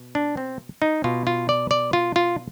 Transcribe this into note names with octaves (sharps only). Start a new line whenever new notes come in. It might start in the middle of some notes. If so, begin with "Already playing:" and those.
Already playing: B2
D4
C4
D#4
B2 F4
F4
D5
D5
F4
F4